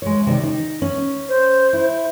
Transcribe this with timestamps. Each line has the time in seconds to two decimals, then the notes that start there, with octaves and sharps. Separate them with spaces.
0.02 G#3 C#5
0.27 C3 D#3 D5
0.43 D#4
0.82 C#4
1.29 C5
1.73 E4